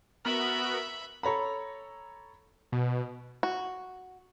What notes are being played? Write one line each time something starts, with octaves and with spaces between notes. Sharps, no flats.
B3 F#4 A#4 E5 B5
A4 C#5 A#5 B5
B2
F#4